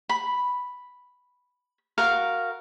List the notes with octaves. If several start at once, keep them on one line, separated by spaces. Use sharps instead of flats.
B5
F#4 A#4 F5